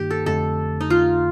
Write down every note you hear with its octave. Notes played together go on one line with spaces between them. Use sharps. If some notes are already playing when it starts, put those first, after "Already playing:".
Already playing: G2 D#3 A#3 D#4 G4
A4
F2 D3 A3 A4
D#4
F4